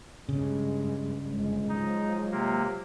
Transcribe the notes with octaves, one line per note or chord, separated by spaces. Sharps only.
G2 C#3 G#3
G1 G#3
F3 F#3 D#4
C3 A#3